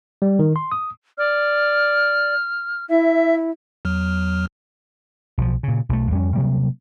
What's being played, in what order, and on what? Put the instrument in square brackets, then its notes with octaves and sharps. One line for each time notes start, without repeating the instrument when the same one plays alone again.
[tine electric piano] G3
D#3
C6
D#6
[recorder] D5 [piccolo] F6
[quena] E4 [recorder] E5
[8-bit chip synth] E2 F#3 F6
[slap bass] B1 F3
A#2 C#3
B1 A3
F2 G3 G#3 C#4
C3 F#3 G3 A#3